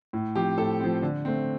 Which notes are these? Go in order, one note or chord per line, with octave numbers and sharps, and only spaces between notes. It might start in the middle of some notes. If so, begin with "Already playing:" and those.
A2
F3 C4 G4
A2 A4
F3 C4
D3
A3 C4